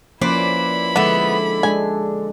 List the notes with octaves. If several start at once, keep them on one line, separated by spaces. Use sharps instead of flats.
F3 A#3 C#4 E4 B4 C5 D5 B5
D3 F3 G#3 B3 E5
G#3 D4 G#4 G#5